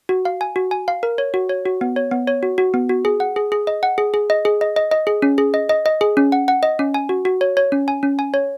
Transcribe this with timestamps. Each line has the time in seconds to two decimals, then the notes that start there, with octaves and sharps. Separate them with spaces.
0.09 F#4
0.25 F5
0.41 G#5
0.56 F#4
0.71 G#5
0.88 F5
1.03 A#4
1.18 C#5
1.34 F#4
1.49 C#5
1.66 F#4
1.81 B3
1.96 C#5
2.11 B3
2.28 C#5
2.43 F#4
2.58 F#4
2.74 B3
2.89 F#4
3.05 G#4
3.20 F#5
3.36 G#4
3.52 G#4
3.67 D#5
3.83 F#5
3.98 G#4
4.14 G#4
4.30 D#5
4.45 G#4
4.61 D#5
4.76 D#5
4.91 D#5
5.07 G#4
5.22 C#4
5.38 G#4
5.54 D#5
5.69 D#5
5.86 D#5
6.01 G#4
6.17 C#4
6.32 F#5
6.48 F#5
6.63 D#5
6.79 C#4
6.94 G#5
7.09 F#4
7.25 F#4
7.41 C#5
7.57 C#5
7.72 C#4
7.88 G#5
8.03 C#4
8.19 G#5
8.34 C#5